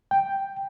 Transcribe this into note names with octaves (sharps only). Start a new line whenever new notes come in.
G5